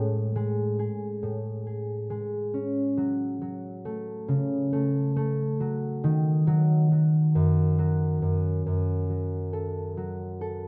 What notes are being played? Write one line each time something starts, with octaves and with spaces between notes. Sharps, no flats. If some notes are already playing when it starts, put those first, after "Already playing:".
Already playing: A2 G#3 C#4
G#3
G#4
A2
G#4
G#3
C#4
F#3
F#3
A3
C#3
A3
A3
F#3
D#3
F#3
F#3
F#2
F#3
F#2
F#2
F#3
A4
F#3
A4